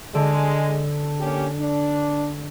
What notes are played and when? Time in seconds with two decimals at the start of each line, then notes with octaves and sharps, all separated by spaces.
0.15 D3 G#3
1.20 A#3 C#4 G4
1.59 D4